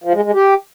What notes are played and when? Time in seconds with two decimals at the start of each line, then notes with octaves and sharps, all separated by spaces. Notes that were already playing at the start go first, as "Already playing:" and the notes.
0.04 F3
0.14 G#3
0.24 G#3
0.34 G4